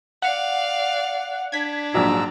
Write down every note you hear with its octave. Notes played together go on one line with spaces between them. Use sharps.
D5 F5 F#5
D4 G#6 B6
A#1 G#2 F3 F#3 A#5 E6